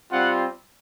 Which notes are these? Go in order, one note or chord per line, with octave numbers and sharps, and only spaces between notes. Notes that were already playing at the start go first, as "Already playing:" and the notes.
G3 C4 F4 F#5